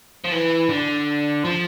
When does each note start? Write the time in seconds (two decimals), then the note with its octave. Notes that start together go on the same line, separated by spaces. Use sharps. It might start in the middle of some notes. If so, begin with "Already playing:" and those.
0.25 F3
0.32 E3
0.70 D3
1.45 F3